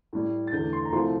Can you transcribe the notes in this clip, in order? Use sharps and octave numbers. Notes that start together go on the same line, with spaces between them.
A2 G3
A6
E2 D3 A3 G6
C6
A#5
C2 C3 F3 A3 C6